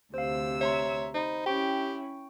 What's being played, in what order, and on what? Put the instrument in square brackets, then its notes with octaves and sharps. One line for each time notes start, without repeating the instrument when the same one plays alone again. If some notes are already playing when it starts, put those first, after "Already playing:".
[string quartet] D2 C3 E6 [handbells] C5 F5
[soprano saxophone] C#5 [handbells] E5 A#5 C6
[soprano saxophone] D#4 [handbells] C5 B5
[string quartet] C#4 E4 [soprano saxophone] G4 [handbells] G5 C#6